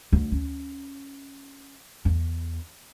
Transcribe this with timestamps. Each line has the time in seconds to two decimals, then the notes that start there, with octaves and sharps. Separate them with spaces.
0.13 D2
0.32 C#4
2.05 E2